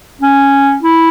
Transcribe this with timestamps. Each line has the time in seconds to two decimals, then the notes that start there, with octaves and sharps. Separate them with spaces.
0.21 C#4
0.82 E4